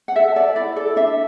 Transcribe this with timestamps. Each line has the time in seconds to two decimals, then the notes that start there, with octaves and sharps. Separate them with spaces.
0.08 F#5
0.16 A4 E5
0.36 A4 D5
0.56 E4 D5
0.76 A4 D5
0.96 D4 E5